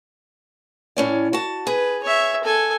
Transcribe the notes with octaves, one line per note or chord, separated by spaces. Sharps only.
A2 C#4 D5
F#4 A5
G#4 B4
C#5 E5
A4 G#5